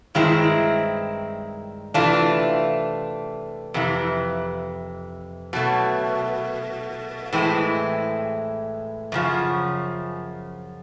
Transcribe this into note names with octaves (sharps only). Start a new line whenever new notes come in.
G2 D#3 G#3 C4 E4
C3 E3 A3 D4 F4
F2 C3 E3
B2 F#3 A3
A2 E3 G#3 C4 E4
F#2 C#3 F3